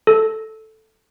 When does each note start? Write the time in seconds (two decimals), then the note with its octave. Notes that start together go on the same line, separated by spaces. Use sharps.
0.07 A4